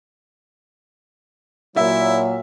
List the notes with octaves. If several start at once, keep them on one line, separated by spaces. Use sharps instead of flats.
A#2 F#3 E4 E5